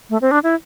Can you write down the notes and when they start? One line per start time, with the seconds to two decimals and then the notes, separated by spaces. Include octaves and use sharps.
0.10 A3
0.22 C4
0.31 D4
0.43 E4